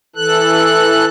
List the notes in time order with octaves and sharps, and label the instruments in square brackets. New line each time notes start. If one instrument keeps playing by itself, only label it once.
[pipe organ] E3 A4 F#6